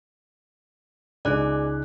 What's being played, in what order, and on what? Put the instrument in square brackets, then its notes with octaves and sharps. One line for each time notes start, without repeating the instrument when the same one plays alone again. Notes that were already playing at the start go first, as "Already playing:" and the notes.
[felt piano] C#2 D#4 F#6 [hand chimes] G#4 D5